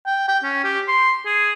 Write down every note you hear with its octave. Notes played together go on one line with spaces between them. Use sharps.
G5
G5
C#4
G4
C6
G#4